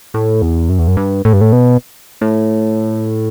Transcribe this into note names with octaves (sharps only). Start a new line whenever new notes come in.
A2
E2
F#2
E2
F#2
G2
A2
G2
A2
B2
A2